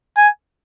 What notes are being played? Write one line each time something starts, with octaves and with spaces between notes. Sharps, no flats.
G#5